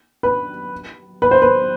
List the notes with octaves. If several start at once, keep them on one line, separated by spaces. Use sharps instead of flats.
B4
B4
C5
B4